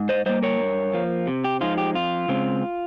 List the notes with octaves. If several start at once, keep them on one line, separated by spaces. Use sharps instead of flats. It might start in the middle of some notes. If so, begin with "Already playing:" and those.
Already playing: G#2
C5 D#5
G3 A#3 C5 D#5
A#4 C#5
G2
F3 A#3
C3
G4
F3 G#3 D#4 F4
G4
F2 F4
C#3 G#3 C4